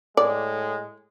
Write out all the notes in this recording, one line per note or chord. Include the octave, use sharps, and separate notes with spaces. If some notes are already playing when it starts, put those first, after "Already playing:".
A2 G#3 D5